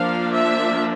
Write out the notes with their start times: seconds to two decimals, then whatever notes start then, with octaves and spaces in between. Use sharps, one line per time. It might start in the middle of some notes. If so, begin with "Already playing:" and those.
Already playing: F3 A#3 D4 F5
0.31 E5